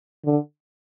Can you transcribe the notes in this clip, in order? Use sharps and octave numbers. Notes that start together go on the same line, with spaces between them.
D3